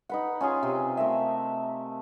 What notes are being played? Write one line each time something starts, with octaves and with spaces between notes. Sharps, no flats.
D#4 B4 F#5
C#4 F4 G#4 C6
C3
A3 A#4 E5